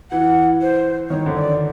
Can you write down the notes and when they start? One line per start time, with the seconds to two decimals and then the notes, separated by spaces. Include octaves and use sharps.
0.11 E3 F#5
0.61 C5
1.10 D#3 C#5
1.26 D3
1.35 D5